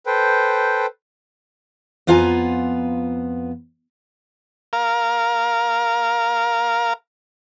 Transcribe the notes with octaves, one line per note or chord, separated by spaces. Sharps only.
A4 B4 C5 G5
F2 B3 F4 F5 G#5 A#5
A#4 F5